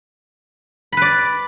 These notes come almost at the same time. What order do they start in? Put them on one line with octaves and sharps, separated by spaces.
B5 B4 D5